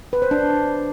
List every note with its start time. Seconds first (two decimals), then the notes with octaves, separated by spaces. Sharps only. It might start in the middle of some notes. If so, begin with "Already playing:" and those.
0.13 B4
0.22 C5
0.31 D4